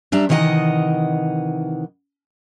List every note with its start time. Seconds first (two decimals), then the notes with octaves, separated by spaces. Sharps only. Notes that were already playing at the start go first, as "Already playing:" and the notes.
0.12 G3 D4 E5 A#5
0.29 C3 D#3 E3 D#5 F#5